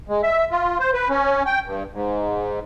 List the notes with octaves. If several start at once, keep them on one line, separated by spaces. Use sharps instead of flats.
G#3
E5
F4
C5
B4
C#4
G5
G2
G#2